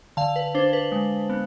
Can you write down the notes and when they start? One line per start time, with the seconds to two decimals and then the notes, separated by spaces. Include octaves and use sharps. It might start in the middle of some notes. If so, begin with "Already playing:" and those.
0.17 D3 F5 A5
0.36 B4
0.55 D4 C5
0.73 B4
0.92 G#3
1.30 B3